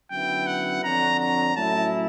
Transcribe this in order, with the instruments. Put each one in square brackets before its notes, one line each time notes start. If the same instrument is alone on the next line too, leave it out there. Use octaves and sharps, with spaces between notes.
[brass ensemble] F#2 D3 F#3 B3 E4 [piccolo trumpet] G5
[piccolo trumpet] F#5
[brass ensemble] F2 D3 F#3 [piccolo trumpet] A#5
[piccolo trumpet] A#5
[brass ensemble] A2 F#3 A3 C#4 E4 [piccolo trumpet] A5